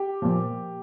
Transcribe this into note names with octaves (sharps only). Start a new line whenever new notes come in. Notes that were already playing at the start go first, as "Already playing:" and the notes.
Already playing: G4
A#2 F3